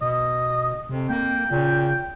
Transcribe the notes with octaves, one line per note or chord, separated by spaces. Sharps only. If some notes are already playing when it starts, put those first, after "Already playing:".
B2 D#5
F2 C3
A#3 G5
A#2 C#3